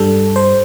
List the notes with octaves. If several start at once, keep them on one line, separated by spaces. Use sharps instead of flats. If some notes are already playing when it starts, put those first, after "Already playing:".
Already playing: G2 G3 A4
C5